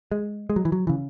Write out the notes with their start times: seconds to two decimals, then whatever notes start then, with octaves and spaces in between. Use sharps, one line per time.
0.12 G#3
0.50 G#3
0.56 F#3
0.65 E3
0.72 F#3
0.87 C#3 E3